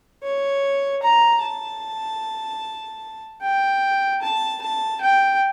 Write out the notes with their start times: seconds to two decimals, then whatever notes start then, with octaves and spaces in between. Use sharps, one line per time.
0.23 C#5
1.03 A#5
1.43 A5
3.42 G5
4.22 A5
4.62 A5
5.01 G5